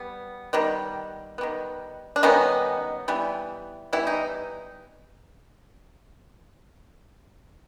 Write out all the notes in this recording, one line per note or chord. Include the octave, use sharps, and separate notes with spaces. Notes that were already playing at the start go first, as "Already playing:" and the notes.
Already playing: G3 B3
D#3 G3 B3
D#3 G3 B3
D4
D#3 G3 B3 C#4 D#4
E3 G3 B3
E3 G3 B3 E4
D#4